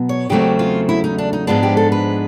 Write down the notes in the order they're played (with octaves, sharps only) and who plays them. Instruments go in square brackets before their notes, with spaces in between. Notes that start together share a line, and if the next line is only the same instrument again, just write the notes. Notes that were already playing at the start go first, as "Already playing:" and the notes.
Already playing: [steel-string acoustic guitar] B2 F#3 B3
C#5
E2 C#3 F#3 A3 C4 G4
F4
E4
D#4
D4
D#4
G#2 F3 G#3 B3 D4 F4
G4
A4
B4